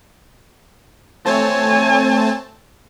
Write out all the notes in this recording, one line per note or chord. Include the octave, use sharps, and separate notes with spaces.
A3 C4 C#5 G#5 A5